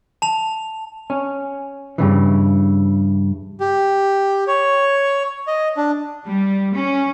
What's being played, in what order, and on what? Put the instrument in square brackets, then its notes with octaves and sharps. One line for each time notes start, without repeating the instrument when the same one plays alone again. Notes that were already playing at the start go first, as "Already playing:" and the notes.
[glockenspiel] A5 F7
[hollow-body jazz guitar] C#4
G2 C#3 E3
[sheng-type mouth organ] G4
C#5
D#5
D4
[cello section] G3
C#4